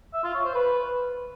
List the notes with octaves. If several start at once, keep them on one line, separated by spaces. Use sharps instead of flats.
E5
F4
C#5
C5
B4